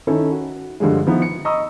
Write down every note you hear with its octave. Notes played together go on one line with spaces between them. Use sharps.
D#3 C#4 E4 A4
F#4
G2 D3 F3 G3 G#3
D#3 F3 B3 E4
C#7
D#5 A#5 B5 C#6 D#6 E6